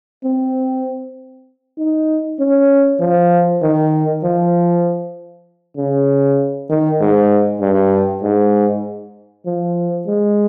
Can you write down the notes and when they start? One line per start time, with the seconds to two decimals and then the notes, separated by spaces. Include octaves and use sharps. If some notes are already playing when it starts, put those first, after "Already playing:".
0.24 C4
1.78 D#4
2.40 C#4
3.00 F3
3.62 D#3
4.23 F3
5.77 C#3
6.69 D#3
7.00 G#2
7.61 G2
8.23 G#2
9.46 F3
10.07 G#3